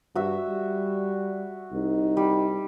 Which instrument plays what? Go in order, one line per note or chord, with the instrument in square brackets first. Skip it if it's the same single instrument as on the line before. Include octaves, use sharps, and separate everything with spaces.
[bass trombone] G2 [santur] F#4 E5
[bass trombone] G3
[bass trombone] C2 [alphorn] D#4
[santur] G3